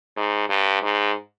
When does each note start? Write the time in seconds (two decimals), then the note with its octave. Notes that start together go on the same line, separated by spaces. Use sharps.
0.17 G#2
0.49 G2
0.82 G#2